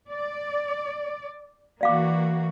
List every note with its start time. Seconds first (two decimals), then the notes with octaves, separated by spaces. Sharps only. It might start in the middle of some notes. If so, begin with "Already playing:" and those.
0.12 D5
1.81 E3 A#3 F#4 D5 F5 D6